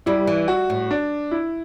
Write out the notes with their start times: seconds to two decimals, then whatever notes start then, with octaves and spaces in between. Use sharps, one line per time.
0.06 G3 E4
0.27 E3
0.48 F#4
0.70 A2
0.91 D4
1.31 E4